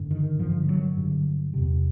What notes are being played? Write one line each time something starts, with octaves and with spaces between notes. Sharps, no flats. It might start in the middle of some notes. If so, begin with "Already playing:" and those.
Already playing: G2 D3
D#3
G2 D3 F3
F#3
G2 D3
E2 C3